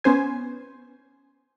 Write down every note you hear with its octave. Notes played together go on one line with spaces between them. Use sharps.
B3 C#4 C5 G#5